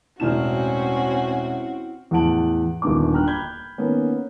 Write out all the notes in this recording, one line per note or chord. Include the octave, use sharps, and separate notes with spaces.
E1 A2 C4 C#4 E4 F#4 F6 E7
E2 A2 F#5 A5 D7 F#7
D#1 G2 D3 B3 D6
G5 A#5 F6 F#6
B5 G6 G#6
D#3 A#3 B3 C#4